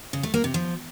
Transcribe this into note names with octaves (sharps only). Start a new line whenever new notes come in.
C#3
A3
A#3
C3
F3